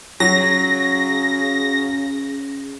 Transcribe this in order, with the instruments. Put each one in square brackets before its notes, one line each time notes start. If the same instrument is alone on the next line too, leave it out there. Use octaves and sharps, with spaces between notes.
[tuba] C#3 [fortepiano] F#3 [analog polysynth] A#6